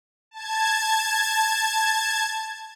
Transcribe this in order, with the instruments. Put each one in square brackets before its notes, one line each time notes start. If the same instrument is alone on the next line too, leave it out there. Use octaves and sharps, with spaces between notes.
[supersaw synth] A5 G#6